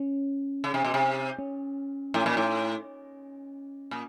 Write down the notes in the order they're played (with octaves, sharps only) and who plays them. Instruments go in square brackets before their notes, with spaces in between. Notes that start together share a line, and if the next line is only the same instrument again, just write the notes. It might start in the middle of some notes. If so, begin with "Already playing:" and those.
Already playing: [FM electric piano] C#4
[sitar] C#3
C3
B2
C3
[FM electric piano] C#4
[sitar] A2
A#2
A2
A#2